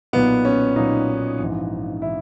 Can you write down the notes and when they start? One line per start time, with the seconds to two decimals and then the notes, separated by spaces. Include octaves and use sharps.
0.13 B1 A#2 B3
0.45 C#4
0.76 B1 A#2 D#4
1.39 A#1 G#2 E3
2.02 E3 E4